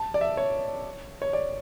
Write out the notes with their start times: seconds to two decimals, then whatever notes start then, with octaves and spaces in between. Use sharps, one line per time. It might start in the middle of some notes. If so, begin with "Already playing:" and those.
Already playing: A5
0.14 D5
0.21 E5
0.37 C#5
1.22 C#5
1.33 D5